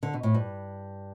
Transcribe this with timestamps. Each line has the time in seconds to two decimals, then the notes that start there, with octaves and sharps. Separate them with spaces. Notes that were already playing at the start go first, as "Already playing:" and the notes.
0.03 D3
0.14 B2
0.23 A2
0.34 G2